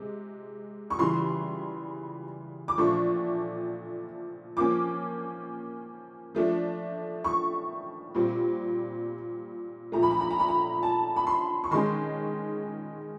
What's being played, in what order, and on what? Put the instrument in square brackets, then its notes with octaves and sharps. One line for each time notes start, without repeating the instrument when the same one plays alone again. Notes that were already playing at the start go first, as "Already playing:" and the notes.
Already playing: [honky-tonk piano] C3 G#3
C#6
C#3 E3 G3 C6
D6
A#2 F3 A3 D4 C#6
F3 A#3 C#4 D6
F3 A3 D4
C#6
A#2 G3 C4
A#2 F3 A3 A#5
B5
A#5
B5
A#5
B5
A#5
A5
B5
C6
C#6
D#3 G#3 C#4 C6